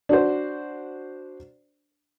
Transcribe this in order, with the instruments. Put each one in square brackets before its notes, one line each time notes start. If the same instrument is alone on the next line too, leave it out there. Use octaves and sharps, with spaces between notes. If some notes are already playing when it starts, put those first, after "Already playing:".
[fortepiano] D4 F#4 C5